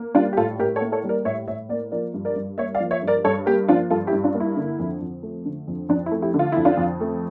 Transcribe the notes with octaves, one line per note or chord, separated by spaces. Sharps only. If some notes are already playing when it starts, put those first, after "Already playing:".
Already playing: A#3
G3 D4 F4
G4
A2 F4 A4
A2 G4 A#4
A4 C#5
A#3
A4 C#5
G3
A#4 D5
A2 C#5 E5
A2 C#5 E5
A#3 A#4 D5
F3 A#4 D5
G2
A#4 D5
G2
A#3 C#5 E5
D5 F5
F3
C#5 E5
G2
A#4 D5
G2 A4 C#5
A#3 G4 A#4
F3 D4 F4
G2 F4 A4
E4 G4
G2
D4 F4
A#3
E4
D3
F2
F2
A3
D3
F2
F2 D4
E4
A3
E4 G4
D3
F4
F2 E4
D4 F4
F2
A3